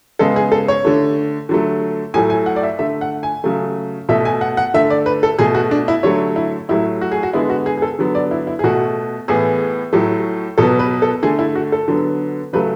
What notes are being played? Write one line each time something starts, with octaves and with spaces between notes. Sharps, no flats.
C#3 G#3 B3 A4
G#4
A4
C#5
D3 A3
D3 F#3 A3
A2 F#3 A3 G#5
G#5
F#5
D5
E5
D3 A3 E5
F#5
G#5
C#3 F#3 A3
B2 A3 E5
G#5
F#5
F#5
D3 A3 E5
D5
B4
A4
B2 A3 G#4
F#4
D4
E4
D3 F#3 A3 C#5
E4
A2 F#3 A3 E4
F#4
G#4
F#4
D3 G#3 B3 E4
F#4
G#4
G#4
A4
D3 F#3 B3
D5
E4
E4
G#4
B2 A3 F#4
A2 E3 B3 G#4
A2 F#3 A3
B2 F#3 B3 A4
B4
A4
D3 A3 G#4
E4
F#4
A4
D3 F#3 B3
C#3 F#3 A3 B4